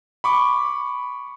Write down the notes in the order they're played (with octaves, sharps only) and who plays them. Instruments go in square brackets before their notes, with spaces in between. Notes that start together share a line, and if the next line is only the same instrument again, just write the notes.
[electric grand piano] B5 C#6 D6